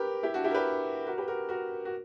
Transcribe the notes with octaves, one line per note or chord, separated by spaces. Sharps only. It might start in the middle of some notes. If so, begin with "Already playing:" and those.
Already playing: G4 A#4 B4
E4 G4
D4 F#4
E4 G4
A#4
G4 B4
F#4 A#4
G4 B4
F#4 A#4
F#4 A#4
F#4